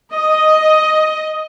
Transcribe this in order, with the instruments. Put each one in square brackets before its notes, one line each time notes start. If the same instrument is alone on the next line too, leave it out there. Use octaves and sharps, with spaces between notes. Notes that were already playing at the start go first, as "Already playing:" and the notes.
[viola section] D#5